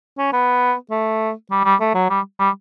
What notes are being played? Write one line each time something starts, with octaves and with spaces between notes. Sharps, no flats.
C#4
B3
A3
G3
G3
A3
F#3
G3
G3